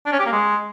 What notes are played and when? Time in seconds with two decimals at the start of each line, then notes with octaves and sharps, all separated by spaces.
0.06 D4
0.13 C#4
0.19 G4
0.26 A#3
0.32 G#3